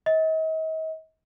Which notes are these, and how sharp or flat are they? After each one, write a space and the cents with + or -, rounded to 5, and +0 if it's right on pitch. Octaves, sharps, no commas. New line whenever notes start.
D#5 +40